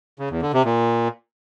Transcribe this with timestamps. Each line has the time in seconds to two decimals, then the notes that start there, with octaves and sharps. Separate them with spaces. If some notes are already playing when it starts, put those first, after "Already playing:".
0.19 C#3
0.30 E2
0.42 D3
0.53 C3
0.65 A#2